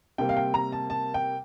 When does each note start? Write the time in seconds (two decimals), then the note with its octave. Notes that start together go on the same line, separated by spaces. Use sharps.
0.18 C3 G3 A#3 G5
0.29 F5
0.36 G5
0.54 A#5
0.72 A5
0.90 A5
1.14 G5